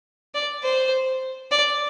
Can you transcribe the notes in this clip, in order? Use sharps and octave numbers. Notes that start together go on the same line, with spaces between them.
D5
C5
D5